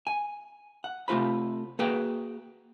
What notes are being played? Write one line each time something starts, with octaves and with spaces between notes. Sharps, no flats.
G#5
F#5
C3 A3 F4 C5 B5
A#3 F#4 G#4 B4 F#5 G5